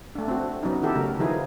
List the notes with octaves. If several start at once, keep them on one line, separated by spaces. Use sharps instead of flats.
A3 D4
C4 F#4
F#3 B3 C#4 D#4
D#3 E4 F#4 G4 A4
C#3 A3 A#4
D#3 F3 D#4 E4 G#4 B4